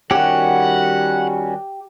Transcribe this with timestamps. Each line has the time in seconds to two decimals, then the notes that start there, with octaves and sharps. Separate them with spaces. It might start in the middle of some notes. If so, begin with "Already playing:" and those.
0.11 D#3 G3 C#4 F#4 G4 F#5